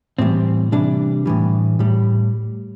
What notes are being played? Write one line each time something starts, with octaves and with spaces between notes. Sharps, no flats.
A2 E3 G3 C4
C3 E3 G3 D4
A2 E3 G3
A2 G3